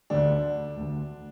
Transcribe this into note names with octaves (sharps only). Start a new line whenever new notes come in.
D2 D3 D4
D2 D3